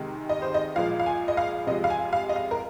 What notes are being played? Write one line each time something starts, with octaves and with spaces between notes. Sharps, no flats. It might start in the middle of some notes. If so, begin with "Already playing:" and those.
Already playing: C3 D#3 G#3
D#5
C5
D#5
A#2 F3 G#3 F5
F5
G#5
D#5
F5
C3 F3 G#3 D#5
F5
G#5
F5
D#5
F5
A#4